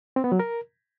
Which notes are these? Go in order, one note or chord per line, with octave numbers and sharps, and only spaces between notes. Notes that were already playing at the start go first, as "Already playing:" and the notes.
C4
B3
F#3
A#4